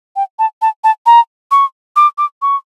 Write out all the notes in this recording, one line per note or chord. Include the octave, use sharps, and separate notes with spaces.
G5
A5
A5
A5
A#5
C#6
D6
D6
C#6